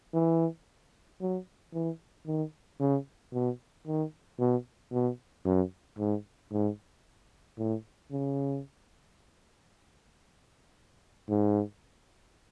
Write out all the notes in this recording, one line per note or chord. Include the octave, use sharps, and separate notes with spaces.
E3
F#3
E3
D#3
C#3
B2
D#3
B2
B2
F#2
G#2
G#2
A2
C#3
G#2